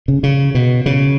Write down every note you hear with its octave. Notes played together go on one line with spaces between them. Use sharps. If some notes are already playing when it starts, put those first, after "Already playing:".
C#3
C#3
B2
C#3